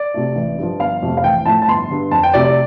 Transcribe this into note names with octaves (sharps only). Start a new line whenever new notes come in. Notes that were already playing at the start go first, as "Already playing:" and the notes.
Already playing: D5
C3 A3
A1
G2 F3
G1 F5
F2 C3 A3
F5
A1 G5
A2 F3 A3 A5
A5
G1 C6
G2 D3
F2 A5
G5
C3 A3 D5
D5